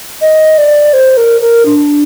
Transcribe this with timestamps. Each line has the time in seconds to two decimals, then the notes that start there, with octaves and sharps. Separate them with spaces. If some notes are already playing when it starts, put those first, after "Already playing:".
0.21 D#5
0.58 D5
0.93 C5
1.17 A#4
1.41 A#4
1.65 D4